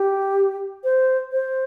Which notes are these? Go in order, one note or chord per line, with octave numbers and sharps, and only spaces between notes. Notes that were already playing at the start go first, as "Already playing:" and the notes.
Already playing: G4
C5
C5